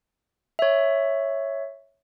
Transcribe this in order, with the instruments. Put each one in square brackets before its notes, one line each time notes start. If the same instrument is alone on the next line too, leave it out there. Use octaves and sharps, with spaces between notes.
[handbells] C#5 E5